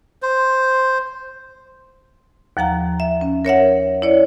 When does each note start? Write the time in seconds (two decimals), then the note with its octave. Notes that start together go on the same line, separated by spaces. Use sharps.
0.22 C5
2.57 D#2 F3 F#5 A#5
3.00 E5
3.21 C#4
3.45 A#4 C#5 E5 F#5
4.02 E4 C#5 D5